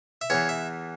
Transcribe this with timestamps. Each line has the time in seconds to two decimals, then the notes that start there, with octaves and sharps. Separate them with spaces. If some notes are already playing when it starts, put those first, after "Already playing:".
0.21 E5
0.30 E2 E3 C#5
0.49 E5